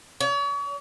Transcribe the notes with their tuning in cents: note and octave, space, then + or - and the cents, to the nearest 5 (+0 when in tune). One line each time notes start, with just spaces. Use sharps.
C#5 +40